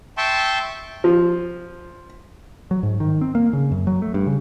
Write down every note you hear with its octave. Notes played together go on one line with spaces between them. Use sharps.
E5 G5 A5 C6 C#6
F3
F#3
G#2
D#3
C4
A#3
C#3
F#2
F#3
A3
G2
C#3